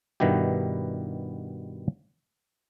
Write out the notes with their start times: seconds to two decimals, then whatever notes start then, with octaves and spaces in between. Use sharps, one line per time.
0.20 G2 B2 D#3 B3 E4 G4